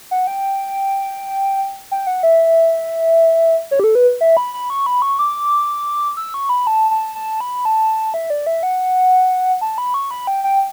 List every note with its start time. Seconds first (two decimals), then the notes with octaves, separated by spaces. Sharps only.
0.11 F#5
0.27 G5
1.91 G5
2.07 F#5
2.23 E5
3.71 C#5
3.80 G4
3.84 A4
3.95 B4
4.21 E5
4.37 B5
4.54 B5
4.70 C#6
4.86 B5
5.02 C#6
5.19 D6
6.17 E6
6.34 C#6
6.49 B5
6.67 A5
6.91 A5
7.15 A5
7.41 B5
7.65 A5
8.14 E5
8.30 D5
8.47 E5
8.63 F#5
9.61 A5
9.78 B5
9.94 C#6
10.11 B5
10.27 G5
10.44 G5